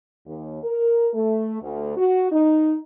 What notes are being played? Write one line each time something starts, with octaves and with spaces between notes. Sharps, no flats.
D#2
A#4
A3
D2
F#4
D#4